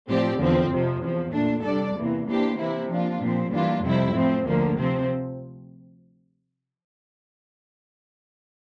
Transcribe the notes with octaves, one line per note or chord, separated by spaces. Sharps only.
A2 F3 C4 G4 D5
E2 D3 F3 C4
F2 C3 F3
E2 C3 F3
A#2 A3 D4
C3 G3 D4 A4 D5
E2 C3 E3 A#3
E3 A#3 D4 G4 C5
C3 E3 A#3 E4
F3 A#3 D4 F4
A#2 F3 C4
E3 G3 A#3 D4 F4
F2 C3 G3 C4 E4
A2 F3 C4
D2 D3 F3 A#3
C3 F3 C4